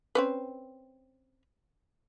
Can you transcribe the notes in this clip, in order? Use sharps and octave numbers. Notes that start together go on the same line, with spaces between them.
C4 C#4 B4